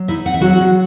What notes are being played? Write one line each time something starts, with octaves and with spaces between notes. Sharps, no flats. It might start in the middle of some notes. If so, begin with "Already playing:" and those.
Already playing: F#3
D#4 E4 E5
C4 F#5
E5
F#3 F#4 F#5
F#3